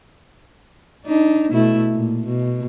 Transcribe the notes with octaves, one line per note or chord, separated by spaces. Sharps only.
D4 D#4
B2 A3 E4
A#2
B2